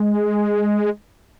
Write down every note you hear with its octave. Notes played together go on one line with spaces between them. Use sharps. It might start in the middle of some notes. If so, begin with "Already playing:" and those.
Already playing: G#3